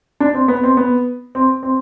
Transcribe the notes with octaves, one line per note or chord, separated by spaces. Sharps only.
D4
C4
B3
C4
B3
C4
C4